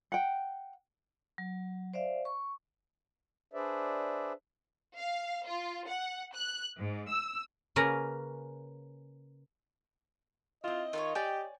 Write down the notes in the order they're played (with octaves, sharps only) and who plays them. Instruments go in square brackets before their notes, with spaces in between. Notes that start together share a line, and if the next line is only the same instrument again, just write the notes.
[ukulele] F#5 G5
[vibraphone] F#3
C5 D5 E5 F5
C#6
[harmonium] D4 G#4 B4 C5 D5 E5
[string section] F5
F4
F#5
F#6
G#2
E6
[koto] C#3 A#3 C#4 A#4 B4
[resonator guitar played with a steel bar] C4 E4 [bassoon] F4 [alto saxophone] D#5
[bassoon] D#3 [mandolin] F4 A4 C#5
[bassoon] G4 [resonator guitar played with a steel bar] C#5 D5 G#5 [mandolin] G5